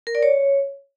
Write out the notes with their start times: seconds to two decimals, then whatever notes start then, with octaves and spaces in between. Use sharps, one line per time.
0.07 A#4
0.15 D5
0.23 C#5